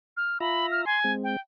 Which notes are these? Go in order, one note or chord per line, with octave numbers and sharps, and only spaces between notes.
F6
F4 E5 A#5 B5
F6
G#5 C6
G#3 C4
G5